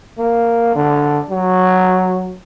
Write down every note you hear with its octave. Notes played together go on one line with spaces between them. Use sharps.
A#3
D3
F#3